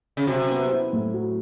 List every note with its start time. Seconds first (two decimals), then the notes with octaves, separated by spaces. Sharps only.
0.17 C#3
0.27 C3 F#3
0.50 B3
0.71 E4
0.93 A2
1.14 F#3